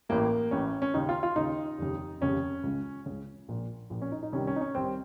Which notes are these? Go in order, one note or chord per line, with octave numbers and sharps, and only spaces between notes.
A1 A2 A#3
A1 A2 C#4
C#4
D#2 C#3 D#4
F4
F4
D#2 C#3 D#4
F1 D#2 C#3
F1 D#2 C#3 C#4
C#2 C#3
C#2 C#3
A#1 A#2
A#1 A#2
C#4
D#4
D#4
C2 C3 D#3 C#4
C#4
D#4
C#4
C2 C3 D#3 C4